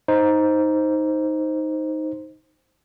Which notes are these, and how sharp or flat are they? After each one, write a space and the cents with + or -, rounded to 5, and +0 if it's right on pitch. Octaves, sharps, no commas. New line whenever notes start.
D#4 +5 C5 +0